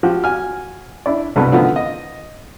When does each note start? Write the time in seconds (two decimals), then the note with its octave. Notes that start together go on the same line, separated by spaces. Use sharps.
0.03 F3 F#4 G4
0.24 F#4 G#5 F6
1.06 D4 E4 D5
1.36 C2 G2 B2 A4 B4
1.52 D3 D#3 F3 A3 B3
1.76 D#5